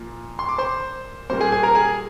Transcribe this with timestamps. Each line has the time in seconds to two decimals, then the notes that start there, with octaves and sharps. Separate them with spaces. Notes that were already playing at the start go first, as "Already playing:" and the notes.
Already playing: A#2 F3 A#3
0.39 C6
0.49 D6
0.58 C5 C6
1.30 A#2 G3 A#3 C5 C6
1.41 G#4 G#5
1.52 G#4 G#5
1.63 A#4 A#5
1.75 G#4 G#5